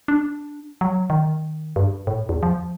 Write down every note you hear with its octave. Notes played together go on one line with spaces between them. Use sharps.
D4
F#3
D#3
G2
A2
E2
F3